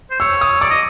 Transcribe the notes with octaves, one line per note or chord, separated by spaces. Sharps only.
C5
C#5 E6
D#6
D5 D6
D#5